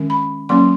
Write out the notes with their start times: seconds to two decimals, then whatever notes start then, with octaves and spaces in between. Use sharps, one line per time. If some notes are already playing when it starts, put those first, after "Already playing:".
Already playing: D#3 G#3 C#4
0.10 B5
0.49 F#3 A#3 C#4 C6